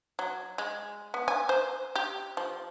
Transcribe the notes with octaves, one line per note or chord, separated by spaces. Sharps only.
F#3
G#3
B3
G#5
C5
G4
F3